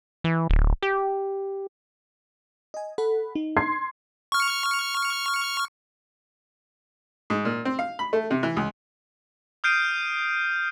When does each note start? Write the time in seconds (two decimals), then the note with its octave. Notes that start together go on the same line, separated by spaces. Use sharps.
0.24 E3
0.50 D1
0.83 G4
2.74 D#5 G#5
2.98 A4 F#5 B5
3.35 D#4
3.57 C6 G#6 C7
4.32 C#6 F6
7.30 G#2
7.45 A#2
7.65 C4
7.79 F5
7.99 B5
8.13 A3
8.31 C3
8.43 E3
8.57 C#2
9.64 D#6 F6 G6 C7 D7 D#7